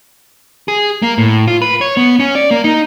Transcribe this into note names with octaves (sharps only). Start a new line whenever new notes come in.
G#4
A#3
A2
F4
B4
C#5
B3
C#4
D5
A#3
D#4